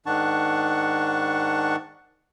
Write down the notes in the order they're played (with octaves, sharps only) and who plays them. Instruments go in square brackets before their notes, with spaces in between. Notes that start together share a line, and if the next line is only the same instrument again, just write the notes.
[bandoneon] G#2 D#3 D4 F#5 A5 C#6